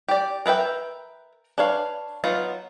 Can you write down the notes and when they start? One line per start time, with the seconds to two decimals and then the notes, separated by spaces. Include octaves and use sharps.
0.08 G4 D5
0.46 A#4 B4 E5 G5
1.58 D4 B4 C#5 F5
2.24 F#3 B3 D#4 F4